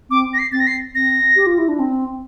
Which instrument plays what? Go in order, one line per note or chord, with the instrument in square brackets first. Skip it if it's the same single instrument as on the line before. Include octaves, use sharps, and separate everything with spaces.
[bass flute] C4 [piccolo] D6
[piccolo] A#6
C7
[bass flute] C4 [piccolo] A6
[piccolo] A#6
C7
[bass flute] C4 [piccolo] A#6
[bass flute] G4
F4
E4
D4
C4